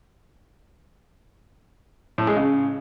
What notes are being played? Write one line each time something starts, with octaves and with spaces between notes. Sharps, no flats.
A2
G#3
C#3